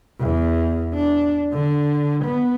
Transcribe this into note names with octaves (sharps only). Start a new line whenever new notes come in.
E2
D4
D3
B3